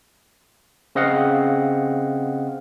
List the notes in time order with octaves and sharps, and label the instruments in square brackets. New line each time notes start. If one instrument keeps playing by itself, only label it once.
[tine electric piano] C#3 C4 D#5 F5 F#5